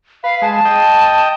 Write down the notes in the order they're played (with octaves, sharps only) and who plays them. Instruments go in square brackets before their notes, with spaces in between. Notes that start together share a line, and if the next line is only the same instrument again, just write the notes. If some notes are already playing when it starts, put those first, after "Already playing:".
[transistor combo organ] B4 [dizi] F5
[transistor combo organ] G#3 [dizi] A5
[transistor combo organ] D#5 G5